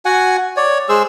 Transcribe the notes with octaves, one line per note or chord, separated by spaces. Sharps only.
F#4 F#5 G#5
C#5 D5
G#3 G#4 C5 E6